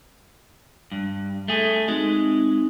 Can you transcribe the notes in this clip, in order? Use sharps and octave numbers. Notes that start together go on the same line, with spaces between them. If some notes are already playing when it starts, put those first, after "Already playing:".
G2
A3 G#4
G#3 C4 D#4 F#4